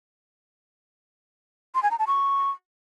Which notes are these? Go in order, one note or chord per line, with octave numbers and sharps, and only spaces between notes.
C6
G#5
A#5
A5
C#6